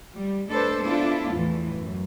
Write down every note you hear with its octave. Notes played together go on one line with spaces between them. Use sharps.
G3
G#3 A3 D4 A4 B4 C5
B3 D4 E4 F4 A4
E2 A2 E3
F#2